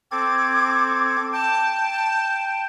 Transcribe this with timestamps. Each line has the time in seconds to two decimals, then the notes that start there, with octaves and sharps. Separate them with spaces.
0.12 C4 A4 D6 G#6
1.33 G5 A5